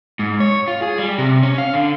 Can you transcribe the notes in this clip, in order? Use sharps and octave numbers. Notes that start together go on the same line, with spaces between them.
G#2
C#5
F4
G#4
G3
C3
C#4
F5
D3